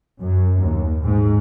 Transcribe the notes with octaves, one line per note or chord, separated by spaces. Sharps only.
F#2
D#2
G#2